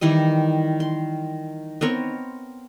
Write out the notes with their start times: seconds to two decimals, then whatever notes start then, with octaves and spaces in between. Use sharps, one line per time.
0.01 D#3 E3 G3 D#5
0.80 C6
1.81 B3 C4 A#4 C#5